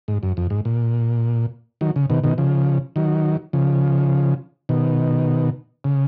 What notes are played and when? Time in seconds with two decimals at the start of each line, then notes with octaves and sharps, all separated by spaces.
0.08 G#2
0.23 F#2
0.37 F2
0.50 G#2
0.65 A#2
1.81 D#3 F#3
1.96 C#3
2.10 B2 D#3
2.23 B2 D#3
2.38 C#3 F3
2.96 D#3 F#3
3.53 C#3 F3
4.69 B2 D#3
5.84 C#3